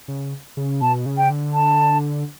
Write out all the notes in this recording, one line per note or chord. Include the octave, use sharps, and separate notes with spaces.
C#3
C#3
B2 A5
C#3
G5
D3
A5